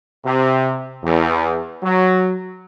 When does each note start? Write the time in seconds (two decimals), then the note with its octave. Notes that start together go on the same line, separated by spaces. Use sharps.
0.24 C3
1.03 E2
1.83 F#3